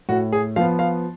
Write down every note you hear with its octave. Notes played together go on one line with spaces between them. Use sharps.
A2 F#4
G#4
F3 B3 F5
F5